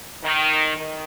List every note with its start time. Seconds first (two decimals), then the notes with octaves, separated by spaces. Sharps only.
0.24 D#3
0.76 D#3